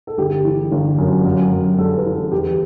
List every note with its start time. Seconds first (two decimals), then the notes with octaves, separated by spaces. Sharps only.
0.07 A4
0.18 G1 G4
0.45 E3
0.72 G1
0.98 F#2
1.25 F#2
1.52 F#2
1.78 G3 A4
1.97 B4
2.05 E3
2.14 A4
2.32 E2 G4